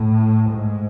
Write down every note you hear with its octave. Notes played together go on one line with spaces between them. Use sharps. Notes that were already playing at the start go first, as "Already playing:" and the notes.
Already playing: A2
G#2